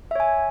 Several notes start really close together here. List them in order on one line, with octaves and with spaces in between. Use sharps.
E5 C#5 G#5